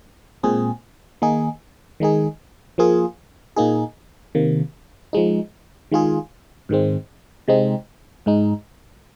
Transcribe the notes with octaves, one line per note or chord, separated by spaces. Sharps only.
A#2 G#3 C4 G#4
D#3 A#3 D#4 G#4
D#3 G#3 D#4 G#4
F3 A#3 F4 G#4
A#2 A#3 D#4 G#4
C3 D#3 A#3
F3 G#3 D#4
D#3 G#3 F4 G#4
G#2 D#3 G#3 C4
C3 G#3 C4 D#4
G#2 G#3 D#4